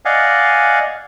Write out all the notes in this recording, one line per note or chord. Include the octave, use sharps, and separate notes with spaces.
D5 D#5 F5 F#5 G#5